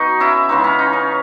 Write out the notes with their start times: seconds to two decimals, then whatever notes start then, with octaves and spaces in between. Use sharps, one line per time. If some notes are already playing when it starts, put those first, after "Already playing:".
Already playing: B2 D#4 F#4
0.20 C#4 E4
0.49 C#3 E3 G#3 D#4
0.64 C#4
0.79 D#4
0.93 C#4